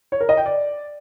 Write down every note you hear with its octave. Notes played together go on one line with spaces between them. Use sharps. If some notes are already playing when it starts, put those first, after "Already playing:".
C#5
A#4
D#5
G5
D5